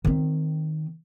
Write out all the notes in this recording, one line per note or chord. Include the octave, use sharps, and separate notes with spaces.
D#3 C4